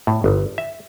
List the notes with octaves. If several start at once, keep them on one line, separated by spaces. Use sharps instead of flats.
A2
G1
E5